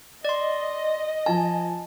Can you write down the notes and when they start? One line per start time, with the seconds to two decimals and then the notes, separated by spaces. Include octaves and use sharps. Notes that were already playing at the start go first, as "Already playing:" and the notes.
0.25 D5 D#5 C6
1.26 F3 G#5 A5